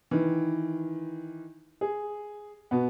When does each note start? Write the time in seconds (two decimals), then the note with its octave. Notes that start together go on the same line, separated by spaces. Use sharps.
0.11 D#3 E3
1.81 G#4
2.71 B2 B3